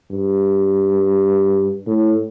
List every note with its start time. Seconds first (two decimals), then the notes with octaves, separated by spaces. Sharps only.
0.11 G2
1.87 A2